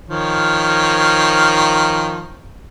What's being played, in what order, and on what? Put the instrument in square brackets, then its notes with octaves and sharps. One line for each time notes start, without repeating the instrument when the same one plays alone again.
[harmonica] D#3 F3 C#5